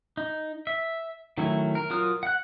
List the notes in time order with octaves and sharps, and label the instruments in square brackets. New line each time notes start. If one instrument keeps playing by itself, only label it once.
[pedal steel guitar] D#4
E5
D#3 F#3 A3 C#4 E4
A#4
F#3 F4 A#4 D#6 F6
F#5 F#6